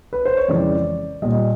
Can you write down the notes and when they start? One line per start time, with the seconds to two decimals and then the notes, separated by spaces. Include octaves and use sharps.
0.13 B4
0.25 C5
0.37 C#5
0.48 F2 C#3 E3 G#3 D5
1.22 A#2 G3 D#5